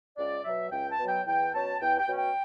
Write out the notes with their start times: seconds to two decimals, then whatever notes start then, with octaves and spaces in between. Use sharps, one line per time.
0.17 C#2 D5
0.45 B2 F#3 E5
0.71 C#2 G5
0.90 A5
0.99 B2 F#3
1.08 G5
1.26 E2 G5
1.53 B2 F#3 C#4 A5
1.80 E2 G5
1.99 G5
2.08 B2 F#3 C#4
2.16 G5